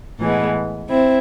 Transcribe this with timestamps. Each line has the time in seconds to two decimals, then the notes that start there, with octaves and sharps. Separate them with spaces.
0.21 A2 E3 G#3 B3
0.90 C4 E4